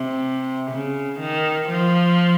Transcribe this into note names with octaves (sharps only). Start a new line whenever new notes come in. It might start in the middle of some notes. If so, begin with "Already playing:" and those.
Already playing: C3
C#3
D#3
F3